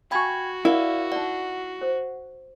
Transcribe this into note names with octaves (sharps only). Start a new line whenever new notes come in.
F#4 F5 G5 G#5 B5 C#6 G#6
E4 A#4 D5 F5 F#5
D#4 D5 F#5
C5